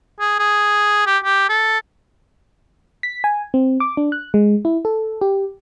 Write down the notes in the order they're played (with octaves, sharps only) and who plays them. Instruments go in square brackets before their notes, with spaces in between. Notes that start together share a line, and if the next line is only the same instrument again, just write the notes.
[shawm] G#4
G#4
G4
G4
A4
[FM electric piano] B6
G#5
C4
D6
D4
F#6
G#3
E4
A4
G4